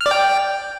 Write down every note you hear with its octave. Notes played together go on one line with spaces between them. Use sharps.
F6
D5
G5